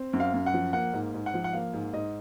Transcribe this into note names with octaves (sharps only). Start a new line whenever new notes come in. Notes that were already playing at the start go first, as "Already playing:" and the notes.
Already playing: C4
F#2
F5
F#2
F#5
F3
A#3 F#5
G#2
G#2
F#5
F3
F#5
A#3 F5
G#2
G#2 D#5